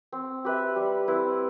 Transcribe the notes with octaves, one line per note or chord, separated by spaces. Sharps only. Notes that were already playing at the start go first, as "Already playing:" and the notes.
C4
G4 B4 E5
G3
C4 E4 B4